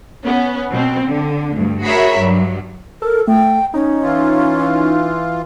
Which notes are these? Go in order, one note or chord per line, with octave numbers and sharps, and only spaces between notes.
B3 C#4
B2 C4
D3
D2 G2
F#4 G#4 A#4 C#5 E5 B5
G2 F#3
A4 A#4
A3 G5
C#4 D#4
E3 F4